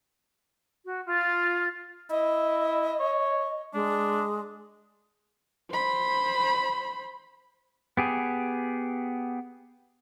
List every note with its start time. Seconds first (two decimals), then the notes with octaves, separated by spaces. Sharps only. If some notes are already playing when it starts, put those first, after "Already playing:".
0.84 F#4
1.07 F4
2.10 E4 D#5
3.00 C#5
3.74 G#3 D4
5.71 C5 B5
7.97 B3 G4 G#4